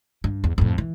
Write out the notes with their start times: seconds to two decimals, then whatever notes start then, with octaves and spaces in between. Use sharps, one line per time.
0.24 G2
0.44 E2
0.58 F2 A2
0.78 E3